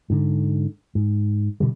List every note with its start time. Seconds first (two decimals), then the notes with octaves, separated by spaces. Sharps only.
0.10 G#2 D3
0.95 G#2
1.60 B2 D3 G3